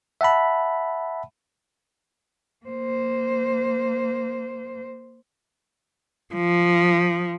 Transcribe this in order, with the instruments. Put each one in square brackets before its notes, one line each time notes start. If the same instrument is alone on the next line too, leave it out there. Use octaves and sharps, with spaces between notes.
[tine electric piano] E5 F#5 A5 B5
[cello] A#3 C5
F3